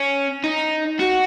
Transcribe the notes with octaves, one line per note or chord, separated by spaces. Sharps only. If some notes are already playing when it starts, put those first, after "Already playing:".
Already playing: C#4
D#4
F#4